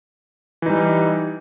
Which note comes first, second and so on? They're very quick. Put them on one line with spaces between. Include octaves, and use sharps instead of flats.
E3 D#4 G3